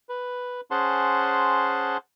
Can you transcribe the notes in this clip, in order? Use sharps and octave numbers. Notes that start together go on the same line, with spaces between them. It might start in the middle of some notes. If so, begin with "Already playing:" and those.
B4
C#4 G#4 C5 F#5 A5 C6